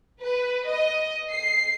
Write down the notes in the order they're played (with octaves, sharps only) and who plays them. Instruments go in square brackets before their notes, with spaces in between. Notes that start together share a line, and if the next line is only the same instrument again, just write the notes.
[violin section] B4
D#5
C7